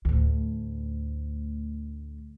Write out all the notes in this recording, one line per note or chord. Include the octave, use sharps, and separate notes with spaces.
D2 A2